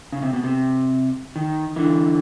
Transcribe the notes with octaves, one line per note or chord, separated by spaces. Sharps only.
C#3
C3
B2
C3
D#3
D3 E3